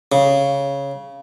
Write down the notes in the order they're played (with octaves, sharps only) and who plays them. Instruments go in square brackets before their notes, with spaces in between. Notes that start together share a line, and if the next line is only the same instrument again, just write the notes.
[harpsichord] C#3